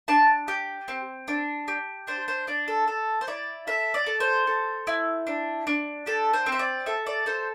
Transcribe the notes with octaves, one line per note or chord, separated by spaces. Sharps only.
D4 A5
G4
C4
D4
G4
D4 C5
C5
D4 D5
A4
A4
C5
E4 D5
A4 E5
D5
A4
C5
A4
E4
D4
D4
G4 A4
C5
C4
E5
D5
A4 E5
D5
A4 C5